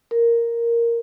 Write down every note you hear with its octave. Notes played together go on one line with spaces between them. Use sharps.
A#4